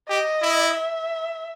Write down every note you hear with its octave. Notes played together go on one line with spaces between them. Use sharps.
G4 D#5
E4
E5